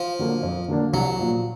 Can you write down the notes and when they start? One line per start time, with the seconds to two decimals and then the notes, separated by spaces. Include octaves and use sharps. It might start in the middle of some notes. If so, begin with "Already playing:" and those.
Already playing: F3
0.19 D3 F#3 A#3 D4
0.43 F2
0.68 D3 F#3 A#3 D4
0.93 C2 F#3
1.19 A#2 F3